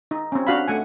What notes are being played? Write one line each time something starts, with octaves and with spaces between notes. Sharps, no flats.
D#4
C4 C#4
D4 F#4 F5 B5
A3 F#5 G#5